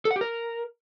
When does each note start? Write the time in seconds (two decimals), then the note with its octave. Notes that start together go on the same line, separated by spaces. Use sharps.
0.05 A4
0.11 F#5
0.16 G4
0.21 A#4